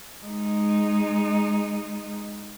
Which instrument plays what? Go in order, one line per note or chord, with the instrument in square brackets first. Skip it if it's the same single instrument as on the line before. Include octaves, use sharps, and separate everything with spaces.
[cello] G#3 D#4